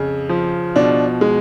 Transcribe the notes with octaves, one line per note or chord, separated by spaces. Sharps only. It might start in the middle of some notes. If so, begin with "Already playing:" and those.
Already playing: F2 C#3
F3
B2 D4
G#3